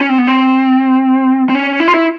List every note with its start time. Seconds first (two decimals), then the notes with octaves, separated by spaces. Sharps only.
0.01 C#4
0.09 C4
0.18 B3
0.27 C4
1.50 C4
1.55 C#4
1.80 E4
1.88 F4
1.94 E4